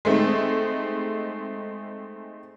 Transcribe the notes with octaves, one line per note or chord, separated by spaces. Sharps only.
G#3 A3 C4 D#4